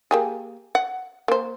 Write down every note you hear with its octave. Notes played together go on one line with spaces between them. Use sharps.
A#3 G4 G#4
F#5
A#3 C5